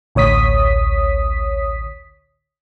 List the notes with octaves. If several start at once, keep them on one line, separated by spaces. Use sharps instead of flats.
A1 D2 C#5 D#6 B6